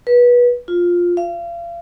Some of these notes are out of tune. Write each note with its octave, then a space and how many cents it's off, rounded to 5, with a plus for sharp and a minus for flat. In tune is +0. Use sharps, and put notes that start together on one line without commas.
B4 -25
F4 +5
F5 -35